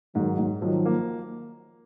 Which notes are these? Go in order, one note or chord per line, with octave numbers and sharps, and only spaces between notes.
G#2 D#3 F#3
G#2
D#3 F3 F#3
A#3